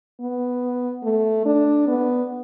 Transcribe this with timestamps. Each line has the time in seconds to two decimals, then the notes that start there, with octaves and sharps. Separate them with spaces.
0.20 B3
1.03 A3
1.46 D4
1.88 B3